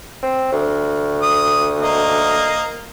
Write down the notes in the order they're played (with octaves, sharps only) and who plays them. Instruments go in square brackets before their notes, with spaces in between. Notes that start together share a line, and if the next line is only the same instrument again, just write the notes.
[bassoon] C4
D2
[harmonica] D#6
A#3 D#5